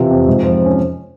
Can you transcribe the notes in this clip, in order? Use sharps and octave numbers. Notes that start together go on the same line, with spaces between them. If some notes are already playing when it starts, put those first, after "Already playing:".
Already playing: C3 E3 F4
F2
G#2
F3
C#4